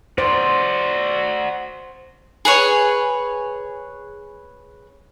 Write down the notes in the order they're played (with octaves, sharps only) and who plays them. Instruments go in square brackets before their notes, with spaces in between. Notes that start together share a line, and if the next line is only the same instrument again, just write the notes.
[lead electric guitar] F#4 D5 [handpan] C5
[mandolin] G#4 B4 C#5